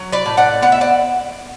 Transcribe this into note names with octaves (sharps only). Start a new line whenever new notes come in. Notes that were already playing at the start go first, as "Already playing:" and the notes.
Already playing: F#3
B4 D5
A2
D5 F#5
B3 F#5
E5
D5 F#5